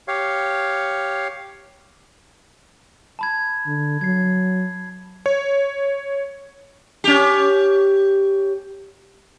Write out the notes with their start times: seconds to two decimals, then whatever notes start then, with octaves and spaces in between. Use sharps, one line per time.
0.08 G4 C#5 F5
3.19 A5 B5 G#6
3.66 D3
4.01 F#3 G#6 C7
5.26 C#5
7.04 C#4 G4